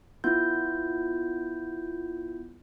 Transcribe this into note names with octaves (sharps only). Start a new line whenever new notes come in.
B3 E4 F4 G6